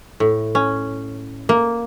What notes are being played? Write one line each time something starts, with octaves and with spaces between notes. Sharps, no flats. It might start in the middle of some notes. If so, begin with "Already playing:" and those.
A2
C#4
A#3